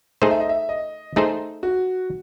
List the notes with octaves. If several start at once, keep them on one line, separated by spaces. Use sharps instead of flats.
A3 D#4 G#4 C5
E5
D#5
E5
D#5
A3 D#4 G#4 C5
F#4